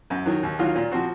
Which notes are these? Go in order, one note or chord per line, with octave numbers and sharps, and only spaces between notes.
F#2
D#3 F#3
D#2
D#3 F#3 A#3 F4
A#2
F3 C4 F#4 C5